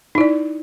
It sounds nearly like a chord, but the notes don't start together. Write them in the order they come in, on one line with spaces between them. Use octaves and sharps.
D#4 E4 D5